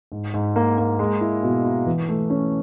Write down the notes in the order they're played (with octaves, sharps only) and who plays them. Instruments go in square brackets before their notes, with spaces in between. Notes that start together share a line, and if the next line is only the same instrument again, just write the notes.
[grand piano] G#2
G#2
A#3
A#3
G#3
E4
B2
E4
E3
A3
C#4